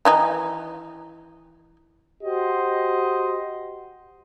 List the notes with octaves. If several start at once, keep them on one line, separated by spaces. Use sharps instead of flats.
D#3 E3 D#4
F#4 G4 C5 D#5